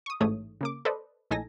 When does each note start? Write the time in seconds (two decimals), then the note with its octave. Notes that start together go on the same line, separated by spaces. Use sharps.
0.06 C#6 D#6
0.21 A1 G#2 A3 C#5 D#6
0.61 C#3 A#3 D6
0.85 A4 B4 C5 D5 D#5
1.31 A#1 A2 D#4 A4 G#5 A#6